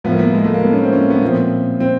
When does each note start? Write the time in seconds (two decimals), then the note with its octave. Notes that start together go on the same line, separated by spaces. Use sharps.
0.04 A2 F3 B3
0.12 A#3
0.19 B3
0.34 G#3
0.44 A3
0.54 A#3
0.63 B3
0.73 C#4
0.82 C4
0.93 C#4
1.10 B3
1.22 A#2 F3 C4
1.80 C4